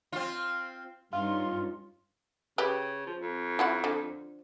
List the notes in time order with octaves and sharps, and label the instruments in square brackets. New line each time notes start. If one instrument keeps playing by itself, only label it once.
[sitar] C4 F4
[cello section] G2 C#4 D#4 [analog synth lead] F4 [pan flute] C6
[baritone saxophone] C#3 [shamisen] G4 B4
[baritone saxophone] F3
F2
[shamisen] E4 F#4 F#5
D3 F3